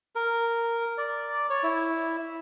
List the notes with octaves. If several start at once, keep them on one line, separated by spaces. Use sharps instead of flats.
A#4
D5
C#5
E4